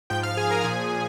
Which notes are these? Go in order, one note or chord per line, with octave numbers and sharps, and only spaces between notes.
G#2 F3 G5 G6
F5 F6
G#4 G#5
A#4 A#5
A#2 F3 G#4 G#5